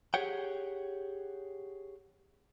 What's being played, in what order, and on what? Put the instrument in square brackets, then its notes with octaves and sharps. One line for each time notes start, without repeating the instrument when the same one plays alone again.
[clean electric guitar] G4 G#4 C#5 F#5 G5